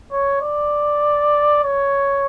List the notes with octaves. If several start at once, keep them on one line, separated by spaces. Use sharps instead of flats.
C#5
D5
C#5